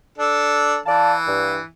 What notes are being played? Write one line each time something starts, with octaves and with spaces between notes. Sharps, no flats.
D4 A4
E3 D5 F5 A5
G2